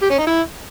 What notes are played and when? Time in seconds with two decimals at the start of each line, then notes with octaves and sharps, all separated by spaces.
0.02 G4
0.10 C#4
0.19 D#4
0.27 E4